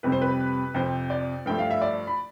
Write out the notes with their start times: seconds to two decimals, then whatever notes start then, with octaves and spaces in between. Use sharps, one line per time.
0.03 F2 C3 G3 B4
0.12 C5
0.22 B4
0.74 F2 C3 F3 C5
1.10 D5
1.46 G2 F3 A3 G5
1.59 F5
1.71 E5
1.82 D5
2.07 B5